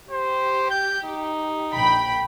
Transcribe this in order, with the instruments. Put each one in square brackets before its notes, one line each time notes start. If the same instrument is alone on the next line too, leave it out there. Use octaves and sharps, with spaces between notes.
[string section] G4 [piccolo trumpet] C5
[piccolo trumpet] G6
D#4
[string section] A#1 G5 B5